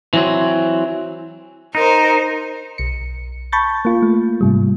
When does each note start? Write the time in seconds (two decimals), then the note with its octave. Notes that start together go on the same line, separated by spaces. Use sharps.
0.14 E3 F#3 C4
1.75 D#4 A#4 C5
2.78 B1 C#7
3.52 A5 B5 C#6 G6 A6
3.85 A#3 F4
4.02 A3
4.41 G#2 C3 G3